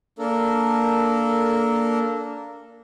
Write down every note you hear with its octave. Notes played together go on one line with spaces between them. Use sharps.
A#3 D4 A4 A#4